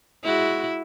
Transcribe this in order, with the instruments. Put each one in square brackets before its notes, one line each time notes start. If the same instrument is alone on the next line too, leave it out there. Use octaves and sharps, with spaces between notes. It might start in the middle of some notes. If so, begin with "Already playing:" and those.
[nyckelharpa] G#3 F#4 [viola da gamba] E4